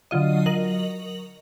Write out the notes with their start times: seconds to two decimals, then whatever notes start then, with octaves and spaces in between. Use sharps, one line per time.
0.11 D3 F#3 F4 D#5
0.46 F#3 A#4 D#5 F#7